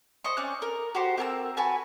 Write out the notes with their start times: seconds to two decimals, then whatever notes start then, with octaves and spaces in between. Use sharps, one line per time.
0.24 C5 D#5 C#6
0.37 C4 C#4 D5 F#6
0.62 A#4
0.95 F#4 G4 C5
1.17 C4 A#4 A5 E6
1.57 F#4 B4 G#5 A5